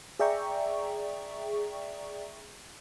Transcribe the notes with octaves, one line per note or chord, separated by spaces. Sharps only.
G#4 D5 E5 G5 A#5 C#6